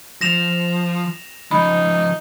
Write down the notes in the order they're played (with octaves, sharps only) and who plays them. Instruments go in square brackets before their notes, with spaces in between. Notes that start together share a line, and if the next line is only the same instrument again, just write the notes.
[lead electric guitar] F3 [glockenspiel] A#6 E7 F7
[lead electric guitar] C#3 F3 [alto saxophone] D#4 [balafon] B5